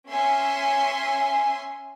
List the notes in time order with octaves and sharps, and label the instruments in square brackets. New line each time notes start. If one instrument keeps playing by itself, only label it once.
[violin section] C#4 E5 G#5 C6